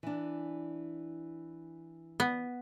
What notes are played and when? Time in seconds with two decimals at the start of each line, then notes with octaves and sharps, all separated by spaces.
0.03 E3 D4
2.20 B3